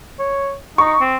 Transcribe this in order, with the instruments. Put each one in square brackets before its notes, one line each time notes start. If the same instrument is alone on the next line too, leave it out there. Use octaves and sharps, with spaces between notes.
[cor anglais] C#5
[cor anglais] D#4 [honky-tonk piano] C#6
[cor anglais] C4